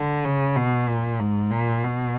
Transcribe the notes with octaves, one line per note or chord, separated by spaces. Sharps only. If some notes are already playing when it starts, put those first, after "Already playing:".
Already playing: D3
C#3
B2
A#2
G#2
A#2
B2